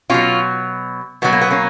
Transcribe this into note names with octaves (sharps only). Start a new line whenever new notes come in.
B2 F#3 C#4 F4
B2 F#3 B3
A#3
B3
A#3 C#4